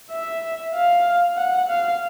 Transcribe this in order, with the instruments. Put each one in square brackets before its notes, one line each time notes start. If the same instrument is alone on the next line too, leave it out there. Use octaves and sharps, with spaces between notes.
[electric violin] E5
F5
F#5
F5